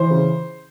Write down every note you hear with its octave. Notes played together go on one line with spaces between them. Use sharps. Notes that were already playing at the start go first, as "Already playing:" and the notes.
Already playing: E3 C5
C#3